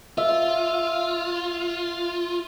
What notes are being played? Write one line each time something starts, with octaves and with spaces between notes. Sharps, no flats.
F4 E5